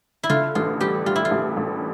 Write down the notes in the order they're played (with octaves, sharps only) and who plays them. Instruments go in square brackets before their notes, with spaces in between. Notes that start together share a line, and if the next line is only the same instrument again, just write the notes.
[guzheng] E4
[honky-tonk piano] D3 [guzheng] F4
[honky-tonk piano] A1 [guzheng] F4
[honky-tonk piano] G3 [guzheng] G4
[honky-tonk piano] G3 [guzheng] F4
[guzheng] E4
F4
[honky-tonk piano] A1
A1